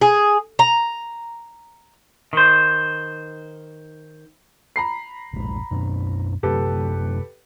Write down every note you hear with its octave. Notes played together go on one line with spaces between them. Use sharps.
G#4
A#5
D#3 C5
A#5 B5 C7
E1 A#1 G#3
F#2 B2 D4
F#2 C3 A3 G4 A4 B4